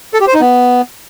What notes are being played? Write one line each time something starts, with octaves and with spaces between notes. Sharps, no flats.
A4
G4
C5
D#4
B3